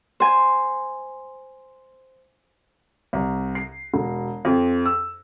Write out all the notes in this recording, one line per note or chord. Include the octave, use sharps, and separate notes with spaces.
C5 G#5
C2
C7
E1
F2
E6